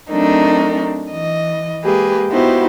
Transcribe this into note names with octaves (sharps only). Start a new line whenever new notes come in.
F#3 A3 C4 D4 D#4 A#4
E3 D#5
G#3 A#3 G4 G#4 B4
B3 D#4 E4 F#4 G4 C5